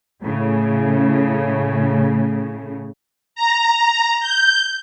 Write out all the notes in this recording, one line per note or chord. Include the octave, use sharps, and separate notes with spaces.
A2 C#3
A#5
G6